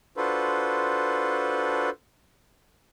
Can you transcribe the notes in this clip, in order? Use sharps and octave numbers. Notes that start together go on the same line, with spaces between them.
D4 F4 F#4 A4 B4 C5